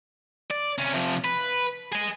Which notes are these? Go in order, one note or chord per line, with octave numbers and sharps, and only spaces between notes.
D5
C3 C#4
C3 F3
B4
G#4 D#5